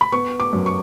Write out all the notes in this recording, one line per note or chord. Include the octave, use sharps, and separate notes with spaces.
B5
B3 C#6
D6
F#2
C#6